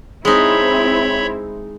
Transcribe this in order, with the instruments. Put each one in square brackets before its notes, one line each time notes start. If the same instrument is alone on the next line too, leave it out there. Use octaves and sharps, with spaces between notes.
[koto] G#3 D#4 [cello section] C4 E4 [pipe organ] C#5 E5 B5